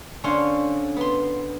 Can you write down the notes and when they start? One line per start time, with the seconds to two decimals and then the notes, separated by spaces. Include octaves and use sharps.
0.24 D3 C#4 C5 C#5 F5 C6
0.96 B3 C6